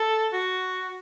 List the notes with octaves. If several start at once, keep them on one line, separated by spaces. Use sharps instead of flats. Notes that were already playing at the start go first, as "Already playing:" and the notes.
Already playing: A4
F#4